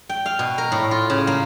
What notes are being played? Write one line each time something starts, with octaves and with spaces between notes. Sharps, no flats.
G5
F5
B2
A#4
A2
F4
C#3
A#3